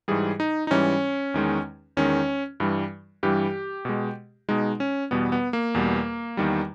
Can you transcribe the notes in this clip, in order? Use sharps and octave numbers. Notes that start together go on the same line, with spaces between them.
G#2 E3 G3 G#4
D#4
D#4
G#2 E3 G3 C#4
E2 D#3 G#3
E2 D#3 G#3 C#4
G2 E3 G3
G2 E3 G3 G4
B2 G#3
B2 G#3 D#4
C#4
E2 B2 G3 B3
B3
A#3
E2 B2 G3
E2 D#3 G3